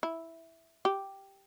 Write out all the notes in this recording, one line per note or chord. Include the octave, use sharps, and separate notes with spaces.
E4
G4